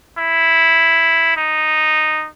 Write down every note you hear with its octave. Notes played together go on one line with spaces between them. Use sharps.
E4
D#4